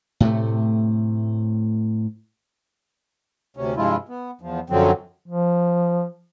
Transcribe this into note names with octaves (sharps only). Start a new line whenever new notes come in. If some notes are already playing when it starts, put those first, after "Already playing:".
A2 C3 A3
D2 C3 C#4
G2 C3 F3 G#3 E4 F4
B3
E2 F3
F#2 D3 F3 F#3 C4
F3